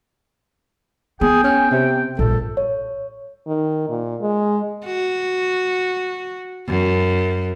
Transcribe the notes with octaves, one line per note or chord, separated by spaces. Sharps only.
B3 G#4 G5
C#4
C3
A#1 G2 A4
C#5
D#3
A#2
G#3
F#4
F#2